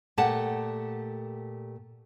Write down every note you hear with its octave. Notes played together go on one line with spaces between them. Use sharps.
A#2 A3 G4 F#5 G5 A5